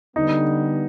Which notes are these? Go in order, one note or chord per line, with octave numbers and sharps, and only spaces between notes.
D3 G3 B3 D#4